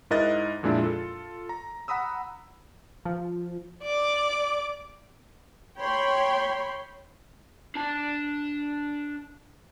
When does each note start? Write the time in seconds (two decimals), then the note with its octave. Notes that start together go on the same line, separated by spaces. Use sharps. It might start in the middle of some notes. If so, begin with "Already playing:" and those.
0.11 G#2 E4 A#4 D#5 F#6 A6
0.63 F2 A#2 G#3 D4 E4
0.80 F4 A4
1.49 A#5
1.88 F#5 A#5 B5 D#6 E6
3.05 F3
3.83 D5 D6
5.78 C#5 G5 B5 C6
7.75 D4 A5